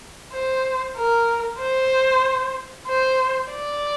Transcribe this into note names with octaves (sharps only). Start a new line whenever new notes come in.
C5
A#4
C5
C5
D5